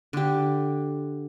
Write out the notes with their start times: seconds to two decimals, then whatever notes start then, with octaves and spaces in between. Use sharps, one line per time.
0.13 D3 G4